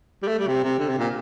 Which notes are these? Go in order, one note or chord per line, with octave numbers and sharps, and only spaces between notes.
G3
A3
G3
C3
C3
D3
C3
A#2